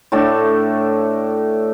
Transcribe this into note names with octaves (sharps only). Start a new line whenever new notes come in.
A2 A3 D4 A5